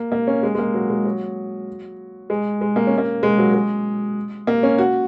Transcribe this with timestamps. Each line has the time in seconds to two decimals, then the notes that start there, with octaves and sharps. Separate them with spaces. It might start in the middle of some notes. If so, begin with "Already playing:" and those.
Already playing: A#3
0.12 A#3
0.27 C#4
0.43 G#3
0.55 G#3
0.58 A#3
0.74 F#3
0.90 G#3
1.05 F#3
2.30 G#3
2.61 G#3
2.76 A#3
2.87 C#4
2.98 A#3
3.23 G#3
3.38 F#3
3.54 G#3
4.47 A#3
4.63 C#4
4.78 F#4